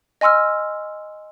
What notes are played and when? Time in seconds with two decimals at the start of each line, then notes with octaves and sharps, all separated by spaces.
0.21 D#5 G#5 C6 E6 F6